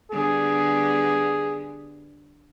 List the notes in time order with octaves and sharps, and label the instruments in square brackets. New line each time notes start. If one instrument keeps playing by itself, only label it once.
[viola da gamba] D3 G3 B3 [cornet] G#4